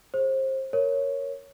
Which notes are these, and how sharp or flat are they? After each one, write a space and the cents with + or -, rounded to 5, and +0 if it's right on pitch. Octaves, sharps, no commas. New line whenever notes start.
G#4 +0 C5 +25
A#4 +0 C#5 +0